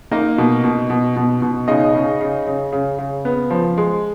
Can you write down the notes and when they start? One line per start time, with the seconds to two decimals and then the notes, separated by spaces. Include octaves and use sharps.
0.11 A#3 D#4 D#5
0.38 B2
0.64 B2
0.90 B2
1.17 B2
1.42 B2
1.68 C#3 D#4 D#5
1.95 C#3
2.21 C#3
2.47 C#3
2.73 C#3
2.99 C#3
3.25 B3
3.50 F3
3.78 G#3